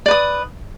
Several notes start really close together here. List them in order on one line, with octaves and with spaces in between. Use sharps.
D5 B4 D#6